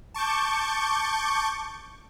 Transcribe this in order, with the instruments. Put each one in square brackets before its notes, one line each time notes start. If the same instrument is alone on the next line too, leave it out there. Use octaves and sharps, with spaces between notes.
[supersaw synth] A5 C#6 D6 G6